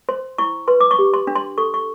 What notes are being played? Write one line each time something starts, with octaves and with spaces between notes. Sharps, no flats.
C5 C6
E4 C#6
B4 C6
D6
C#6
G4
C6
D4
C6
A4 C#6
C#6